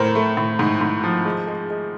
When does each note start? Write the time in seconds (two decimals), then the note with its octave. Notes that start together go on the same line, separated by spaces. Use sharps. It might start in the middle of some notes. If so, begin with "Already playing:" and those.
Already playing: A2 A#4 C5
0.15 A3
0.37 A2
0.59 G#2
0.81 G#2
1.04 F3
1.25 G#3
1.47 G#3
1.70 G#3